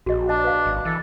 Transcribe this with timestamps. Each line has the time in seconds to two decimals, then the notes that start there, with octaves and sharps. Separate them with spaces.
0.06 A#1 F#4 G#4 D#5
0.29 D4 D#5 A5
0.44 B4 F5
0.66 G#1
0.85 E3 A4